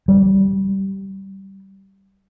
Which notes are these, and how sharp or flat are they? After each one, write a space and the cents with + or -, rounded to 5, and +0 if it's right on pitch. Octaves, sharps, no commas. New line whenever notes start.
G3 -15